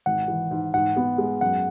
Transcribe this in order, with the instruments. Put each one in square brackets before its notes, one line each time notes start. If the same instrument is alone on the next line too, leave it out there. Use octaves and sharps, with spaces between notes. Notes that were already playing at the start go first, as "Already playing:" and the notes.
[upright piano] G#1 [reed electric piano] F#5
[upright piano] E3
G#2
[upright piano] G#2 [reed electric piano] F#5
[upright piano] B3
G#3
[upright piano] F#2 [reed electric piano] F#5